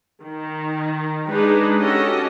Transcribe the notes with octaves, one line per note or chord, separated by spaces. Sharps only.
D#3
G#3 D4 D#4 B4
C#4 F#4 G4 A4 D#5